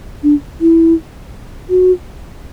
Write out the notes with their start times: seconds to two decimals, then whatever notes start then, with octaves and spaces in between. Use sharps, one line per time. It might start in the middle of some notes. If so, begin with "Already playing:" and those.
0.23 D4
0.61 E4
1.70 F#4